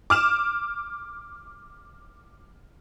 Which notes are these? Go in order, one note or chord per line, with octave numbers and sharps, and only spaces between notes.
D6 F6 E7